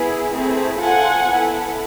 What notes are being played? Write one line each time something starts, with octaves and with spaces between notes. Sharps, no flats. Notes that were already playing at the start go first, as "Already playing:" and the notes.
Already playing: B3 E4 G#4
A3 C4 E4 G#4
C4 F4 A4 F#5 G#5
B3 E4 A4